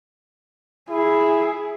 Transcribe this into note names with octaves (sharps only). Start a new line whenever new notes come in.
E4 G#4